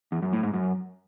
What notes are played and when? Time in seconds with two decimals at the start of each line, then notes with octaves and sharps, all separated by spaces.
0.12 E2
0.22 F#2
0.33 A2
0.43 G#2
0.54 F#2